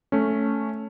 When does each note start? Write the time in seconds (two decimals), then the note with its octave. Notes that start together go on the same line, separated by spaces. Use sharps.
0.12 A3 C#4